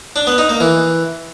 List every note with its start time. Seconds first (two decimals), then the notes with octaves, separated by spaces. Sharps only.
0.16 D4
0.27 B3
0.38 D#4
0.49 A#3
0.61 E3